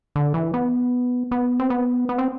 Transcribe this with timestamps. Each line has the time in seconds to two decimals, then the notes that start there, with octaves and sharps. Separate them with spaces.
0.16 D3
0.34 E3
0.54 B3
1.31 B3
1.60 C4
1.70 B3
2.09 B3
2.18 C4